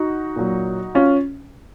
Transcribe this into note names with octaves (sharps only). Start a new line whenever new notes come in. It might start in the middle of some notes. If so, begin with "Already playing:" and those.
Already playing: D#4 F#4
A#2 F#3
C#4 F4